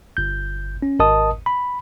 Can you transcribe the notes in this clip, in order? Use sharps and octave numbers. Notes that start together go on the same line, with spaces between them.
G1 G6
C#4
G#1 A#4 D#5 A5 D#6
B5